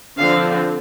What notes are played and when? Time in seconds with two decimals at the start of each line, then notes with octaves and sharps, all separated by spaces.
0.18 D3 F3 C4 F5